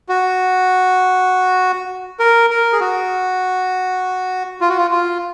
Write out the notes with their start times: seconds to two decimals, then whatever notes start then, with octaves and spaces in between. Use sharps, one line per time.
0.09 F#4
2.20 A#4
2.50 A#4
2.73 G#4
2.80 F#4
4.61 F4
4.69 F#4
4.77 F4
4.91 F4